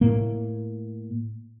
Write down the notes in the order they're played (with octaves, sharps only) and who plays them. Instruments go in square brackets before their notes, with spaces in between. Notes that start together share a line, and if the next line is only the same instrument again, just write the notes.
[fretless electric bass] A2 A#3